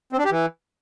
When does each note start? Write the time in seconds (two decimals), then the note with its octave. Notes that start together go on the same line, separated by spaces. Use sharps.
0.13 C4
0.19 D4
0.25 G4
0.31 E3